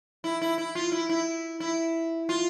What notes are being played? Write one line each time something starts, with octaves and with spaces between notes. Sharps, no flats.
E4
E4
E4
F4
E4
E4
E4
F4